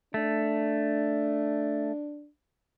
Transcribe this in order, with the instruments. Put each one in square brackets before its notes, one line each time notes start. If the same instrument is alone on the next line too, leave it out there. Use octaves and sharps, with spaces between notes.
[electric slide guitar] A3 [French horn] D4